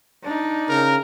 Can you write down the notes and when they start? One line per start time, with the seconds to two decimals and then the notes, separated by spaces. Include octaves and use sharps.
0.24 D4 D#4
0.69 C#3 A#4